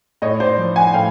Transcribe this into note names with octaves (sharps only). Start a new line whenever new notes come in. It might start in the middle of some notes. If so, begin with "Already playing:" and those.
A2 C#5 D#5
C5 D5
F3
F#5 G#5
A2 F5 G5